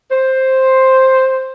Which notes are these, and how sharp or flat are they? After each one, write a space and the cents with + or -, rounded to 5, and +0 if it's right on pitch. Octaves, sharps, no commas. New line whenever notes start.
C5 +5